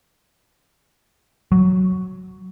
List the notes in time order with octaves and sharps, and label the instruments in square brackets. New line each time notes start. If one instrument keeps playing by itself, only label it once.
[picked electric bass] F#3